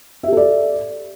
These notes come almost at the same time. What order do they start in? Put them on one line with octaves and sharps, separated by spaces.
E5 G4 A4 D5